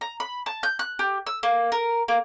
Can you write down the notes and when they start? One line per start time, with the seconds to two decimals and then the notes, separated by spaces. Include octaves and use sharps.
0.01 A#5
0.20 B5
0.46 A5
0.63 G6
0.79 F#6
0.99 G4
1.27 E6
1.43 A#3
1.72 A#4
2.08 A#3